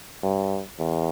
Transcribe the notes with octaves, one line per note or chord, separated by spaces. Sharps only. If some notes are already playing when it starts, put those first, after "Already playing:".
G2
E2